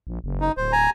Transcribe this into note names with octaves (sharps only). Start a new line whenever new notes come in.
A#1
F#1
D#4
D1 C5
G#5 A#5